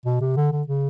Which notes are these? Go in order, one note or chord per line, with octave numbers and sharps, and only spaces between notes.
B2
C3
D3
D3
C#3